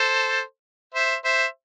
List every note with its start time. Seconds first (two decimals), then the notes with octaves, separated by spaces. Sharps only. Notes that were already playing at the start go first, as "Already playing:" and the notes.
Already playing: A4 C5
0.94 C5 E5
1.24 C5 E5